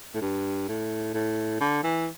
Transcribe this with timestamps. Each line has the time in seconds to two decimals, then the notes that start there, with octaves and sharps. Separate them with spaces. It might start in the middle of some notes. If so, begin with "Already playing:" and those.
0.14 A2
0.21 G2
0.68 A2
1.14 A2
1.61 D3
1.83 E3